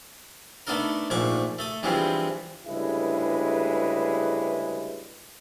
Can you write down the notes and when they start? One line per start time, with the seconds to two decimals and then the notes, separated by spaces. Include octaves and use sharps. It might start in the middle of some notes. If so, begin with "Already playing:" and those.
0.67 A3 B3 D4 D#4 A4 A#4
1.10 A#1 G#2 F3 A3 C#6 D6
1.59 A3 A4 D#6
1.83 G2 E3 F3 G#3 B3 C4
2.65 D2 G2 C#3 G#3 E4 B4